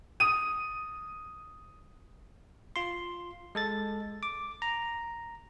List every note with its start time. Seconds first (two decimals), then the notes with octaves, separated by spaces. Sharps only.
0.20 D#6 D#7
2.76 F4 C6
3.55 G#3 A4 A6
4.23 D6
4.62 A#5